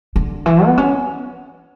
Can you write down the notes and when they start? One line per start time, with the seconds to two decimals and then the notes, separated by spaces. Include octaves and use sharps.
0.16 D3
0.46 E3
0.65 B3
0.78 C#4